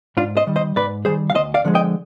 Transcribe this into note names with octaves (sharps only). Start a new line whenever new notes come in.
G#2 D4 F4
C5 D#5
D#3 G3
C5 D#5
G#2 B4 D5
D#3 G3 G#4 C5
F5
D2 C5 D#5
D5 F5
D3 F3 G#3
D#5 G5